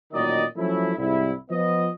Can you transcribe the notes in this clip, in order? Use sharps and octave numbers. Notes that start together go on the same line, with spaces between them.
A1 A#2 D#3 F#3 D5 D#5
F3 F#3 A3 C#4 E4
C2 G#2 E4
F3 B3 D#5